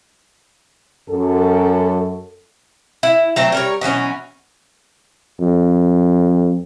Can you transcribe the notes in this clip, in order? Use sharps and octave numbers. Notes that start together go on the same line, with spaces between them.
F#2 A4
E4
F#3 A3 C4
G3 A#4 C#5
B2 E3 F#3 C#4
F2